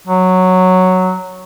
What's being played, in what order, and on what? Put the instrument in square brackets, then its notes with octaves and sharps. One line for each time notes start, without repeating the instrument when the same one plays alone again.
[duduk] F#3